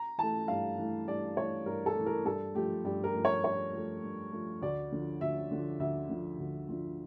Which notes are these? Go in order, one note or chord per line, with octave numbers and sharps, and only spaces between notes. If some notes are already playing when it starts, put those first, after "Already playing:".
Already playing: A#5
E3 A3 A5
G2 F5
E3 A3
G2 D5
E3 A3 C#5
G2 A#4
A4
E3 A3
A#4
G2 A4
F3 A3 G4
G2 G4
A#4
F3 A3
C#5
G2 C#5
F3 A3
G2
F3 A3
D2 D5
D3 F3
D2 E5
D3 F3
D2 E5
D3 F3
D2
D3 F3